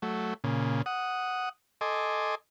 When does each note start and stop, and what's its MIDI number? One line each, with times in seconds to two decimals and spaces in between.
0.02 0.34 54
0.02 0.34 57
0.44 0.82 46
0.44 0.82 49
0.86 1.49 78
0.86 1.49 87
1.81 2.35 69
1.81 2.35 75
1.81 2.35 80
1.81 2.35 84
1.81 2.35 86